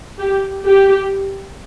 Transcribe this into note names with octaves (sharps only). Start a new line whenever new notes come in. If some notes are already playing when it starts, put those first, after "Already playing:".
G4
G4